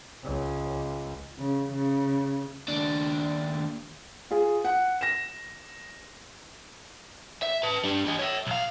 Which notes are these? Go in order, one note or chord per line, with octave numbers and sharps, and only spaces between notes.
C#2
C#3
C#3
D#2 D4
F4 G#4
F#5
A#6 E7
E5
B4 A5
G3 D4
G4 D#5
C#5 E5
B1 F5